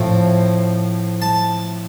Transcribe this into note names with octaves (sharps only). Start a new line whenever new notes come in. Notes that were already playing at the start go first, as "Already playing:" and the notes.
Already playing: A2 F3 C4
A5